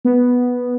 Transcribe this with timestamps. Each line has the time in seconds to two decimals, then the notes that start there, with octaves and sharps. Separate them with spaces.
0.05 B3